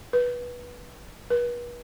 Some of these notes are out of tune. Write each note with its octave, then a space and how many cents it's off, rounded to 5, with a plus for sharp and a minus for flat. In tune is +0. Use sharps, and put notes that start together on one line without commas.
B4 -20
B4 -40